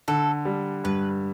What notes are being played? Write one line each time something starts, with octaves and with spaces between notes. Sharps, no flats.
D3 A4
G3
G2 B4